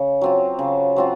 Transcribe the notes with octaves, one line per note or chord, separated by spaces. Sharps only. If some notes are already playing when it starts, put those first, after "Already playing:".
Already playing: C#3
F#3 C4 F4
C#3
F#3 C4 F4